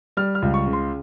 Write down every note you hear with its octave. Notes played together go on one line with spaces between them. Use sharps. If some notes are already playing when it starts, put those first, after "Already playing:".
G3 F6
F6
C#2
C#6
C#3
C6